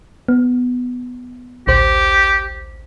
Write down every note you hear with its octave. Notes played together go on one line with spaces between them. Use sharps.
B3
A1 D2 G4 C5